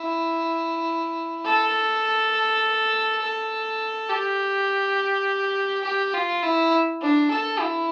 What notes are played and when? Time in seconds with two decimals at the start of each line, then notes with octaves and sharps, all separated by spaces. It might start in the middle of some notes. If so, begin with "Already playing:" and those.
Already playing: E4
1.46 A4
3.21 A4
4.09 G4
5.84 G4
6.13 F4
6.42 E4
7.02 D4
7.31 A4
7.60 E4